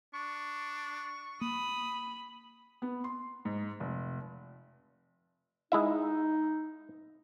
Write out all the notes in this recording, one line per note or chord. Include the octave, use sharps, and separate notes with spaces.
D4 C#6
A#3 B5 D#6
B3
C6
G#2
F1
G#3 D#4 E4 E5